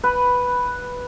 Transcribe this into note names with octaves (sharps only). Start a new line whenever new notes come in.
B4